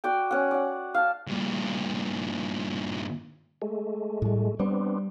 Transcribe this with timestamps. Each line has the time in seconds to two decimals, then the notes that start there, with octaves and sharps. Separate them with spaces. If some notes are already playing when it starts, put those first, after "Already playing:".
0.04 F#4 D5 G5
0.31 C#4 F#5
0.51 D5 F#5
0.94 F5 A5
1.28 G2 A#2
3.62 G#3 A3
4.22 A2 G3
4.60 G3 B3 C4 D4